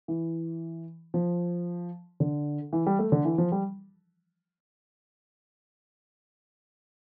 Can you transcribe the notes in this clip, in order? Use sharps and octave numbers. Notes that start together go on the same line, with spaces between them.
E3
F3
D3
E3
G3
A3
D3
E3
F3
G3